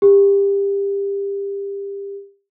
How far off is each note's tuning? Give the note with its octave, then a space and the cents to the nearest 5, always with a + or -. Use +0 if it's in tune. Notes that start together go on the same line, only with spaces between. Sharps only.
G4 +25